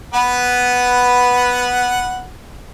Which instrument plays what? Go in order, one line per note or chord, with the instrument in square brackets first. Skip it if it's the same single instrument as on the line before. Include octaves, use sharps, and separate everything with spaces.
[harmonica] B3 B4 F#5